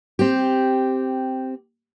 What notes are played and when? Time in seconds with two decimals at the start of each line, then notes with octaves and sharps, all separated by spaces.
0.19 C4 G4